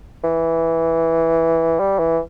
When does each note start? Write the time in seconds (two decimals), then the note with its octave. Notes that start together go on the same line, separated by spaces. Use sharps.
0.24 E3
1.80 G3
1.99 E3